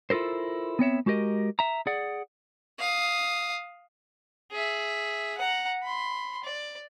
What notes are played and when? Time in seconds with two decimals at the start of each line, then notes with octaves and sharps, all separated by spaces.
0.10 E4 F4 A4 A#4 C5
0.79 B3 C4 C#5 E5
1.06 G#3 F#4 G4 A#4 D#5
1.59 E5 A#5
1.87 G#4 D5 F#5
2.79 F5 D#6
4.51 G#4 E5
5.38 F#5 A#5
5.82 B5 C6
6.44 D5